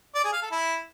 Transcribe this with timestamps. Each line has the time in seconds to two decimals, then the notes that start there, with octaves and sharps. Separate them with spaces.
0.15 D5
0.24 G#4
0.33 F5
0.42 A4
0.52 E4